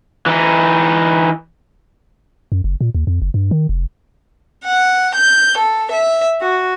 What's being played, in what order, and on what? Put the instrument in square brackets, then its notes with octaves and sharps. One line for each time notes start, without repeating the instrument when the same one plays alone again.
[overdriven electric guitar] E3 D#4
[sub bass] F#2
F#1
A#2
D#2
F2
F#1
G2
D#3
F1
[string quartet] F#5
G6
A4
E5
F#4